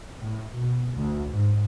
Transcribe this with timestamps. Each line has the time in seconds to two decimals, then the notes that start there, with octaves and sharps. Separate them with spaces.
0.16 A2
0.57 B2
0.95 D2
1.32 G#2